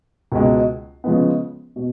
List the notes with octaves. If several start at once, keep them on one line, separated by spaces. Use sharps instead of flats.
C#2 B2 G#3
C#3 F3 G#3 B3
B2